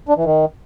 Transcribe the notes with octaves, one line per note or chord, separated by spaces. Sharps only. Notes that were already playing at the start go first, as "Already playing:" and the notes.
D4
E3
D#3